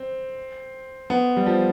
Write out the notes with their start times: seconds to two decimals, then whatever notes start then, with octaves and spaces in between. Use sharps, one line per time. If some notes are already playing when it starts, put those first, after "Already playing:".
Already playing: C4
1.10 B3
1.37 G3
1.46 F3